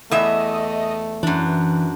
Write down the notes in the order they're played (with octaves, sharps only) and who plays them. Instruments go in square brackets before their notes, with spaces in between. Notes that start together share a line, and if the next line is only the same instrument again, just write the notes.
[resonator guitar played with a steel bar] E2 E5 [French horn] A3 [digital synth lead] D#5
[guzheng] F#2 D4 [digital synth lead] E3